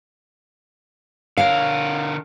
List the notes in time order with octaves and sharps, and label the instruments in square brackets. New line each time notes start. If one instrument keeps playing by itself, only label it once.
[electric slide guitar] D3 A#4 [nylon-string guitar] C#5 F5